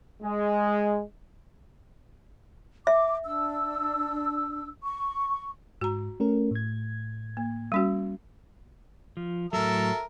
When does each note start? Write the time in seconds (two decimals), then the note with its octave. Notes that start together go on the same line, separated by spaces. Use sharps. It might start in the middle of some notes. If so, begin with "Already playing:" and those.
0.22 G#3
2.87 E5 D6
3.25 D4 E6
4.83 C#6
5.81 G#2 F#4 A#5
6.20 A3 C#4 A#4
6.51 A2 G#6
7.37 A#3
7.72 G3 C#4 F#4
9.17 F3
9.53 A2 F#3 A4 A#4 E5